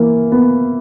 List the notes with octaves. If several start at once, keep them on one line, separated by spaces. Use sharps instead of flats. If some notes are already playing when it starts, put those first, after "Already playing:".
Already playing: E3 A#3
B3